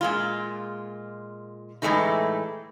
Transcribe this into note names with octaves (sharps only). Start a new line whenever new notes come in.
A#2 G#3 F4
A2 E3 F3 G#3 A3 D#4